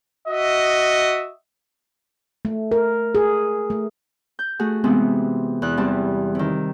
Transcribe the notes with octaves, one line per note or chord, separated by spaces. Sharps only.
F#4 D#5 E5
A3
A#4
G#4
A3
G6
A3 F#4 G#4
C3 E3 G#3 B3 C4
E2 E4 F#6
E3 G3 C4 A5
C3 D#3